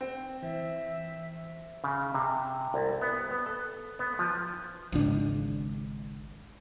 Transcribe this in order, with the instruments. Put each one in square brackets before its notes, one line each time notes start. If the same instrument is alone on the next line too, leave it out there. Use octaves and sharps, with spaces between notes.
[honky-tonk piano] C4
[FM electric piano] E3 [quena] E5
[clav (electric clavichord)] C#3
C3
C2
B3
B3
A4
B3
F3
[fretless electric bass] G#1 C#2 D4